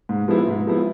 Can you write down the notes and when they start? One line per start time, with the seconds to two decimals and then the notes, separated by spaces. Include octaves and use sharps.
0.09 G#2
0.28 F3 G#3 B3 E4
0.47 G#2
0.67 F3 G#3 B3 E4